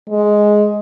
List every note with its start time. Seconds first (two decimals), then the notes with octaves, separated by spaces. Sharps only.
0.10 G#3